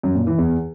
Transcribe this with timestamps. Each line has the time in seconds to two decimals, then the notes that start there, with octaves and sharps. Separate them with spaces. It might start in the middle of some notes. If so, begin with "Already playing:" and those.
0.03 F#2
0.15 A#2
0.27 E3
0.39 E2